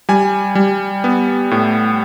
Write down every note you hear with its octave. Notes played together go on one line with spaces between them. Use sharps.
G3 G#5
G3
B3
A2